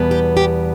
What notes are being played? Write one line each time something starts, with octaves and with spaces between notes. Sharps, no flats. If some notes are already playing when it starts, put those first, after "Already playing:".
Already playing: E2 B2 G3 B3
G4
G4